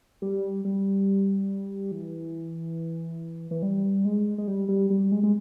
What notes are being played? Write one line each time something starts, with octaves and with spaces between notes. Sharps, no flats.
G3
G3
E3
E3
G3
G#3
G#3
G3
G3
G3
G#3
G#3